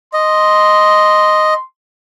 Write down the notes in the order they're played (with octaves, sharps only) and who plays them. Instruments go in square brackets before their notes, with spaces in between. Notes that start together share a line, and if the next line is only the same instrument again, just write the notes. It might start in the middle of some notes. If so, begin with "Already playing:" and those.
[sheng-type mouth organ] D#5 [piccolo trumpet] C6